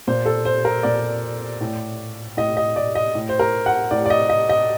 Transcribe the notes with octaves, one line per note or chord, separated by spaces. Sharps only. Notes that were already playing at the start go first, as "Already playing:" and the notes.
A#2 C5
A4
C5
A#4
A#2 D5
A2
A2 D#5
D#5
D5
D#5
A2
C5
A#4
F#5
A2 D5
D5
D#5
D#5
D#5